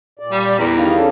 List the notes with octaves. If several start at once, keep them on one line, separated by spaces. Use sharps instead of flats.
A#2 D5
G3
E2 G4 G#4 A#4
D#3 G3 B3 D#4 F5
C#4 D4 A4